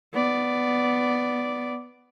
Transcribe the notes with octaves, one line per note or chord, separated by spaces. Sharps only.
B3 D5